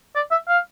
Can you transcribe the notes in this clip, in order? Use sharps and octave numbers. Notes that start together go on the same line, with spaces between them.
D5
E5
F5